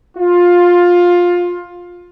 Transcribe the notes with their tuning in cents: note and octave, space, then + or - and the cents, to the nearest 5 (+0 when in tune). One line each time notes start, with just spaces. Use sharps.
F4 +15